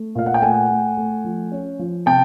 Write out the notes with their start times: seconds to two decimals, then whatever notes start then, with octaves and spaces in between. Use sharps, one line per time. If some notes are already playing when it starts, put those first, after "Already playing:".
Already playing: A3
0.15 A#2 F5
0.26 F#5
0.34 G5
0.42 A3 F#5 G#5
0.70 A3
0.97 A3
1.24 F3
1.52 C#4
1.79 F3
2.06 C3 G5 A5